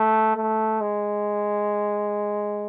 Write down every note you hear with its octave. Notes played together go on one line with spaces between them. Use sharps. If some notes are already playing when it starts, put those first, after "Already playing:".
Already playing: A3
A3
G#3